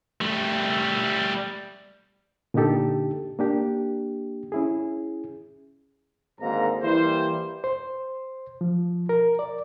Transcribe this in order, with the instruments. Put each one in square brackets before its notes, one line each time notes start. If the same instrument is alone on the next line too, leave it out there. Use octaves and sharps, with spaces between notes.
[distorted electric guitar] G3 A3
[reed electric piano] A#2 D3 D4 D#4 G4 A4
A#3 D4 G4
C#4 E4 G#4
[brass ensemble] G#1 G#2 D3 A#3 A#5
E3 G3 A#3 E4 C5
[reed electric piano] C5
F3
A#4
D5